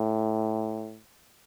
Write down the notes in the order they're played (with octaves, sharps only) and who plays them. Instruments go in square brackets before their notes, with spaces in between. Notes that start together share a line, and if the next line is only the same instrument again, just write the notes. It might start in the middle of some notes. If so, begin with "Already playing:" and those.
Already playing: [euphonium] A2